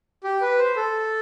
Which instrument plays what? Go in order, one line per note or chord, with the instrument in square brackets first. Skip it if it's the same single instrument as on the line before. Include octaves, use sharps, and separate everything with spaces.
[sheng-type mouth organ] G4
B4
C5
A4